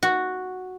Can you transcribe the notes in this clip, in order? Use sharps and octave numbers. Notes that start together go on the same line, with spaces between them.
F#4